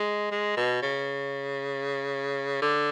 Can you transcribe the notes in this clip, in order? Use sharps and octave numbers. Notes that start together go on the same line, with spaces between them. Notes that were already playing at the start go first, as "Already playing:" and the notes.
Already playing: G#3
G#3
B2
C#3
D3